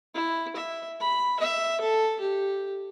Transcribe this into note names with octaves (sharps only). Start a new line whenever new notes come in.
E4
E5
B5
E5
A4
G4